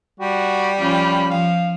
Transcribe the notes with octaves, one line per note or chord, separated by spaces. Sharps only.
G3 F#4
F3 C#4 F4 B5
F3 F5